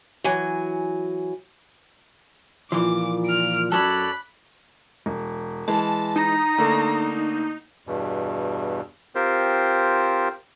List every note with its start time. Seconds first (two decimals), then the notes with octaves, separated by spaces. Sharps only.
0.24 E3 F#3 G#5
2.72 A#2 E3 F3 D6
3.25 F6 D7
3.72 F#2 F#3 A4 C#5 D5 B5 F#6
5.06 E1
5.68 E3 G#3 A5
6.16 D#4 A#5
6.58 D3 A3 A#3
7.87 E2 G2 B2
9.15 C4 F4 G4 A#4 C5